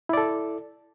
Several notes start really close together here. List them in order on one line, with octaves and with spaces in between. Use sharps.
E4 D5 A4